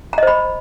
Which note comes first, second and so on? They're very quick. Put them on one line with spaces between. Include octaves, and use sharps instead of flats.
A#5 D#5 C5 B5